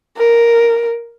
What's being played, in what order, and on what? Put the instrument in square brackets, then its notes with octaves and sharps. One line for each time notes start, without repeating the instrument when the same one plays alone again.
[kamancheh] A#4